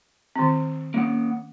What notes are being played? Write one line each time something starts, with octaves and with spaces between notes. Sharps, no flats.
D#3 C4
A#3 C#4 F#5